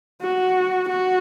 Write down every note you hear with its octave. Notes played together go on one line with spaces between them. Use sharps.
F#4
F#4